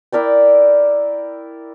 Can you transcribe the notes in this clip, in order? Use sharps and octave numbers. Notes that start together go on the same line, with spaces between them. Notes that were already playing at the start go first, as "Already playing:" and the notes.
E4 A#4 D5 G5